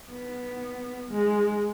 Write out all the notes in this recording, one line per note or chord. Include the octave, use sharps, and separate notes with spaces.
B3
G#3